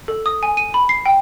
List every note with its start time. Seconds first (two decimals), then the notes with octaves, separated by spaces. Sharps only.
0.08 A4
0.26 D#6
0.43 G#5
0.57 D#7
0.74 B5
0.89 C7
1.06 G5